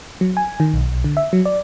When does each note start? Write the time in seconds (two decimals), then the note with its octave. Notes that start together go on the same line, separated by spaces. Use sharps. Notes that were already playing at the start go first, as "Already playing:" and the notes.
0.21 F#3
0.37 G#5
0.60 D#3
0.73 B1
1.04 D3
1.17 E5
1.33 F#3
1.46 D5